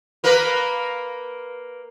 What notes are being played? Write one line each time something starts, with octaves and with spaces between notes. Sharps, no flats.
A#3 A#4 B4